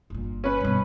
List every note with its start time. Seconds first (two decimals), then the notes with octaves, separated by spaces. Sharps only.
0.10 G1 A#2
0.44 C#4 B4
0.61 G2 B2